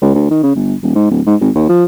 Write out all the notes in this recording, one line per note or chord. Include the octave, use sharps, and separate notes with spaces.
C#2
D2
D#3
C#3
G1
D#1
G#2
D1
G#2
G#1
D#2
F3